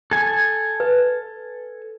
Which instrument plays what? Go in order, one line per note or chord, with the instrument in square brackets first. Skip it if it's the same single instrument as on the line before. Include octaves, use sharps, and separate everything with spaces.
[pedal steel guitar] A4 G#5
[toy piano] B4